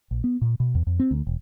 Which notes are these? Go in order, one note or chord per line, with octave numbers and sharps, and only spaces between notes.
A#1
B3
A#2
B2
E2
F2
C4
D2
E1